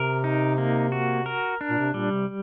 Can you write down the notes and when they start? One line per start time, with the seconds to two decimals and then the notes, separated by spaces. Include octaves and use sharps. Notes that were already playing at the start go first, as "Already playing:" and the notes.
Already playing: C3 A#4
0.24 D#4
0.58 A#3
0.92 F#4
1.26 A#4
1.61 D4
1.70 A#2
1.78 C3
1.94 A#2 G3
2.11 C3